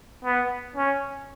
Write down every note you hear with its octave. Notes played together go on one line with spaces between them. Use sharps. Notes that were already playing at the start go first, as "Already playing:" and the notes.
B3
C#4